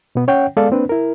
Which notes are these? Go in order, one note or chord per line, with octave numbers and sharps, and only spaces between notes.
B2 B3
C#4 C#5 F#5 G5
G#3 B3 A4 D5 F5
A#3 C4 D4 B4
E4 A#4